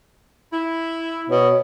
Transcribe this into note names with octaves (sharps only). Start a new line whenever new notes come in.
E4
B2 C#5